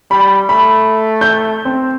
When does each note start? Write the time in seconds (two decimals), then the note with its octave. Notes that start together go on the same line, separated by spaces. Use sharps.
0.11 G3 B5
0.49 A3 B5
1.21 G6
1.65 C4